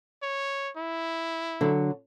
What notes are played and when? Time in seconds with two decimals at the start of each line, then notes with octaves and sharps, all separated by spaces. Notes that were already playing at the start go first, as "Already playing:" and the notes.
0.23 C#5
0.77 E4
1.61 D3 F#3